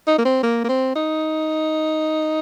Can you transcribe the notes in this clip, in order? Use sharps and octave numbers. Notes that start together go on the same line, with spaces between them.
D#4
A#3
C4
A#3
A#3
C4
D#4